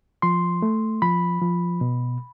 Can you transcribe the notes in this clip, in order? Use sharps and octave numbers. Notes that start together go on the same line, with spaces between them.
F3 C6
A3
F3 B5
F3
B2